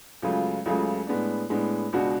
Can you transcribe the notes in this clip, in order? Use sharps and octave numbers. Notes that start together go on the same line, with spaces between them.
C#2 C#3 F#3 A3 F4
C#2 C#3 F#3 A3 F4
A2 G#3 B3 D4
A2 G#3 B3 D4
C#2 B2 G#3 D4 F#4